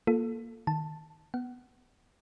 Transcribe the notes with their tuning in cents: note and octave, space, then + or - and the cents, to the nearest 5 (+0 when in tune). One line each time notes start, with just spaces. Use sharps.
A#3 +0 F4 +0 A4 +0
D#3 +0 A5 +5
B3 +0 F#5 +30